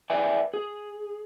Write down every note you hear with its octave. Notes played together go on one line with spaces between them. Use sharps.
B4 D5 E5 G5 G#5
G#4